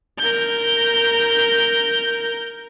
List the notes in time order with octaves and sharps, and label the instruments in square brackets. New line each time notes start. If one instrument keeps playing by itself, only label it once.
[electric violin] A#4 G6